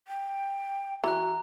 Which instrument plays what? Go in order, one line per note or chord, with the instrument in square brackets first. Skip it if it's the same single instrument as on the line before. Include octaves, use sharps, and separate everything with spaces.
[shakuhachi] G5
[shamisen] E3 [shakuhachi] F#4 [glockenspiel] A#5 F#6